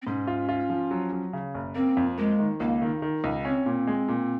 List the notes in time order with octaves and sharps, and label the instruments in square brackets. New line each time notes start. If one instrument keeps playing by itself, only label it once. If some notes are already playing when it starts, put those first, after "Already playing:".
[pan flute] C4
[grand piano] G#2 [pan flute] C#4
[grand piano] F4
F4
F3
F#3
F#3
C#3
F#1
[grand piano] A#3 [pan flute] C4
[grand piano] F2
[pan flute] G#3 [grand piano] A#3
[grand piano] D#3
[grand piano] C#2 [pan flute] A#3
[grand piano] D#3
D#3
C#2
[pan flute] C4 [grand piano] C#4
[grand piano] A#2
G#3
A#2